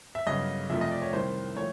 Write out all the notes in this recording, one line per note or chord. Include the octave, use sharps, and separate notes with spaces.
E5
G1 F#2 C#3 D#5
F2 C3 F3 A3 E5
D#5
D5
C#5
C2 C3 D#3 C5
F3 A3 C#5